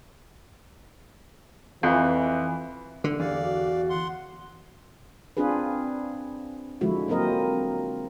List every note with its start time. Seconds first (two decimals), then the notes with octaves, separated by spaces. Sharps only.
1.83 F2 E3
3.04 D3
3.20 E2 G4 D5 F5
3.43 F#4
3.90 F#5 C6
5.37 C4 D4 F4 G#4 B4
6.81 D3 F3 G#3 E4 F#4
7.08 F#3 A#3 C4 A#4 D#5